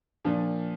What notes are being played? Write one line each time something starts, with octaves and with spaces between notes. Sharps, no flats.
A#2 F3 D4